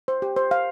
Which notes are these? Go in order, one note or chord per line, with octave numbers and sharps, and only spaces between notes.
C5
G4
C5
F5